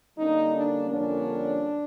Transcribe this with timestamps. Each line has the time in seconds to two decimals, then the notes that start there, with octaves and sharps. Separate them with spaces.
0.18 D3 G3 A#3 C#4 D#4
0.53 D4
0.89 F2 D3 G3 A#3 C#4 D4